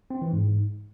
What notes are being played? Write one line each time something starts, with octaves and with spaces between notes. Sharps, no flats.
C4
E3
G#2